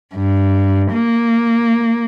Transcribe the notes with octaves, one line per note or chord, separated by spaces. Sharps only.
G2
A#3